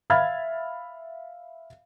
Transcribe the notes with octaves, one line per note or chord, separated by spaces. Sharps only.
E5 F5 B5 F6 G#6 A6